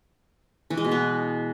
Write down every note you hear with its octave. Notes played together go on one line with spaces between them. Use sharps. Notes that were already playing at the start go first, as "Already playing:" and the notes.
E3
G#3
B2
B3